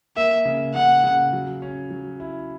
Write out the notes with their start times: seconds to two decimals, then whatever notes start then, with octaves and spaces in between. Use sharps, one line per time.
0.17 A#3 E5
0.45 C#3
0.74 C#3 F#5
1.04 C#3
1.33 F#3
1.62 C#4
1.90 F#3
2.20 E4